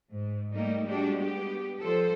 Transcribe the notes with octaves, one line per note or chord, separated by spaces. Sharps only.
G#2
G3 A3 A#3 D#4
G3 G#3 D4 F#4 G4
B3 G4
F3 G3 A4 C5